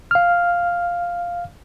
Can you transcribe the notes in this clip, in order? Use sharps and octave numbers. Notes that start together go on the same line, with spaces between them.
F5 F6